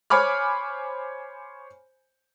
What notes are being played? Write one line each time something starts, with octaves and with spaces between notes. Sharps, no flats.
C5 C#5 G#5 B5 D6 F6